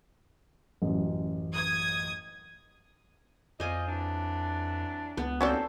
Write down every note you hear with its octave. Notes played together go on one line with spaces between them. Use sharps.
A1 F#2
D#6 G#6
F2 F4 C5 D5 D#5 G#5
E3 F#3 D4
C#2 B3
D#2 C4 C#4 F#4 A4 C5 D5